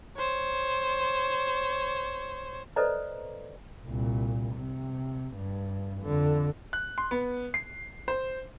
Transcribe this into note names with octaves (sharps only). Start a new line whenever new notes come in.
C5 C#5
A4 B4 C5 D5 D#5 A#5
C2 A#2
C3
G2
F2 D3
F#6
C6
B3
C7
C5